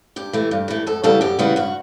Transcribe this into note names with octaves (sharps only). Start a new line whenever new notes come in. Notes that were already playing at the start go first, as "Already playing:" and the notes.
G2 G4
E3 A3
G2
E3 A3
F#2 A4
C#3 E3 G3 B3 A4
F#2 G4
C#3 E3 G3 B3 F#4
G2 F#4